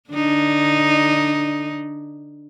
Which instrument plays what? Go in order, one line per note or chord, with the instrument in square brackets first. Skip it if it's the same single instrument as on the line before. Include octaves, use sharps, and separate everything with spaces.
[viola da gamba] D3 D4 D#4